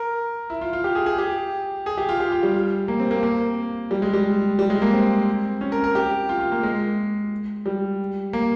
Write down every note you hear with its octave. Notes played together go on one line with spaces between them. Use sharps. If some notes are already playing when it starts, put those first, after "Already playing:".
Already playing: A#4
E4
F4
F4
G4
G#4
G#4
G4
G#4
G4
F4
G4
F4
G3
A#3
C4
A#3
A#3
G3
G#3
G3
G3
G#3
A#3
C4
C#4
A#4
A#4
G4
F4
F4
A#3
G#3
G3
A#3